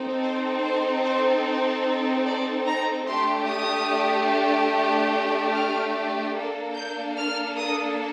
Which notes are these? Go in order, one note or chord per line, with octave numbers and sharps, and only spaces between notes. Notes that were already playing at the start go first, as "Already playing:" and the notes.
Already playing: C4 D#4 A4
C5
C5
C5
C5
D5
A#5
A3 D4 G4 C6
D#6
F6
A#3 D4 A4
G6
F6
D#6